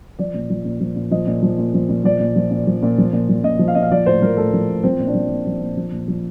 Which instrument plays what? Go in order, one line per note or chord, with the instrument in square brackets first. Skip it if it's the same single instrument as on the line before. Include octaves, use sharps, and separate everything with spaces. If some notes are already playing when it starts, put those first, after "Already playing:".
[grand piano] F3 D5
A#2
F3
A#2
F3
A#2
F3 D#5
A#2
F3
A#2
F3
A#2
F3 D5
A#2
F3
A#2
F3
A#2
F3
A#2
F3
A#2 D#5
F3
F5
A#2 D#5
F5
F3 D5
A2 C5
F3 A#4
A2 A4
F3
A2
F3 C4
A#2
D4
F3
A#2
F3
A#2
F3
A#2
F3